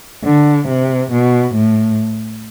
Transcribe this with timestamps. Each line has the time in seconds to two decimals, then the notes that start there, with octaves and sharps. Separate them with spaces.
0.25 D3
0.68 C3
1.12 B2
1.56 A2